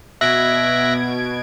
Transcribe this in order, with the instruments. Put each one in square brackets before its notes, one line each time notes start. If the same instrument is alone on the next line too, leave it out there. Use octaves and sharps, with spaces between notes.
[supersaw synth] B2 G#6 D7 [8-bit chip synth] E5 F#6 A#6